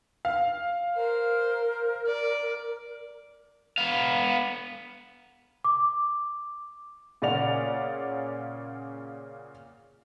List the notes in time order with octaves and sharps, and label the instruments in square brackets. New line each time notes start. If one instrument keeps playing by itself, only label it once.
[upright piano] F5
[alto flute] A#4 [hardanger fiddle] C5
[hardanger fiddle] D5
[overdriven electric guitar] B3 F5
[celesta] D6
[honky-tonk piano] A#2 C#3 C#4 D5 F#5 F7